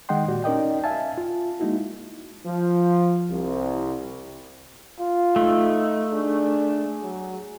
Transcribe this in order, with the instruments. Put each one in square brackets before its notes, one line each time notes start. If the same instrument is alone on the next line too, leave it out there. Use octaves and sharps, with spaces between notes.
[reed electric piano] D#3 G#3 D#5 F#5 G5 C6
A#2 F#4 G4 D5
C#4 D#4 A#4 D5 D#5 G5
E5 F5 G#5 A5
F4
G#3 A#3 D#4 E4 F#4
[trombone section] F3
C2
[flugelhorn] F4
[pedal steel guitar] A3 [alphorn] D#4
[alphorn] D4 [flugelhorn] G#4
[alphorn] F#3